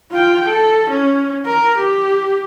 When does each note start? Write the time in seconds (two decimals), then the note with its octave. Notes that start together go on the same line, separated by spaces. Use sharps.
0.11 F4 G5
0.45 A4
0.90 C#4
1.46 A#4
1.78 G4